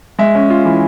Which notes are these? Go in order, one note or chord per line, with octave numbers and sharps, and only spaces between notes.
G#3 E5
C#4
F4
E3